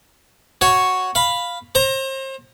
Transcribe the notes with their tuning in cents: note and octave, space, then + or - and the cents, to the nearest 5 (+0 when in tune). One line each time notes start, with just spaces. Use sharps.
F#4 +0 C#5 +0
F5 +0 B5 +0
C5 +35 A#5 +0